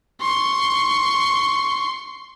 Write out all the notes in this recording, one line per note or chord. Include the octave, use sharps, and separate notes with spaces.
C6 C#6